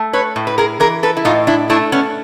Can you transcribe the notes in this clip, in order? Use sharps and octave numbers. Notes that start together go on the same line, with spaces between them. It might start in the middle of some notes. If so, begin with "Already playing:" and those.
Already playing: A3
B4 C#5
A2
B4
G#4 A#4
E3 G#4 A#4
A4 B4
E4
A2 D#4 F4
D4 E4
A3 D4 E4
B3 C#4